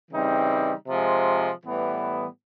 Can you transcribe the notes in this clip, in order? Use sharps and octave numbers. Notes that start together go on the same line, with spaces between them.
C#3 E3 G3 C4 D#4
C3 F3 G#3
A2 E3 G3 B3